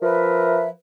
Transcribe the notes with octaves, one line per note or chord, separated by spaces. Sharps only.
F3 A#4 B4 E5